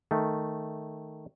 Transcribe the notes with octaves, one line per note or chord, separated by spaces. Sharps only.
D#3 A3